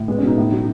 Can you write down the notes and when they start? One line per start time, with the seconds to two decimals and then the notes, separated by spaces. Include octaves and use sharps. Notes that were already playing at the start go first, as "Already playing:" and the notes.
Already playing: A2
0.08 G#3 B3
0.18 C#4
0.23 B2 D#4
0.38 A2
0.52 F#3